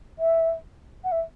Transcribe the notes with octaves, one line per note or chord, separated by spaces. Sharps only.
E5
F#5
E5